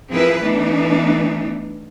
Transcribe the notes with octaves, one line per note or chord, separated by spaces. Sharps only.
F3 C4 E4 G#4 A#4 B4
E3 A3 B3 D4 D#4